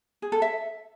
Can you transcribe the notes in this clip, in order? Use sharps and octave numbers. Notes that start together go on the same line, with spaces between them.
G#4
A4
E5